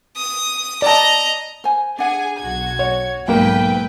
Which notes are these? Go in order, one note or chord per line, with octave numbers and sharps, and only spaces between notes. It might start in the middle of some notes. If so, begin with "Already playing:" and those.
D#6
D5 D#5 A5 A#5
C5 G#5
D4 G#4 F#5 G#5
B1 F#4 G#6
C#5
B1 G#2 A#3 B4 G5